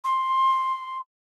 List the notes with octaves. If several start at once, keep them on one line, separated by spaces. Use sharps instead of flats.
C6